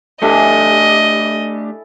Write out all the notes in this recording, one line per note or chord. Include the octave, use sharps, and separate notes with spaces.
A3 D4 E4 G4 A4 D#5 G#5